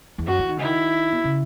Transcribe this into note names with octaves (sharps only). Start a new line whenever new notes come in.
E2
F#2 F#4
E3
D#3
C#3 E4
D#3
B2
C#3